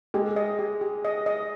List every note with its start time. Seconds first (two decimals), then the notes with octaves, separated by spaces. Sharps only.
0.14 G#3 G4
0.36 D#5
0.59 G4
0.81 G4
1.05 D#5
1.26 D#5